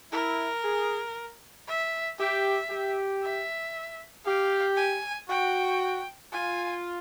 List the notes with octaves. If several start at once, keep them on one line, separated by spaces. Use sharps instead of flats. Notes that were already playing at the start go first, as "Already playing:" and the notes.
E4 A#4
G#4
E5
G4 E5
G4
E5
G4 F5
G#5
F#4 G5
F4 G#5